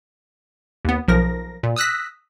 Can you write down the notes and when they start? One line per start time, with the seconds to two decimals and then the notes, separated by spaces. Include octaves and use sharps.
0.85 D#2 B3
1.08 B1 F3 A#4 A#6
1.63 A#2
1.76 D#6 E6 F#6 A#6 B6